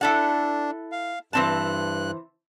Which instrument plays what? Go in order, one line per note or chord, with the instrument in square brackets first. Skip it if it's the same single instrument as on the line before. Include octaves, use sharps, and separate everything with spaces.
[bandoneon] D4 [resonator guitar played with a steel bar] E4 A4 F#5
[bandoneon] F5
[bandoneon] G2 F#6 [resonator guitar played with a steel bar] E3 C4 A5